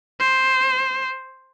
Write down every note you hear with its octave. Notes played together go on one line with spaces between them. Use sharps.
C5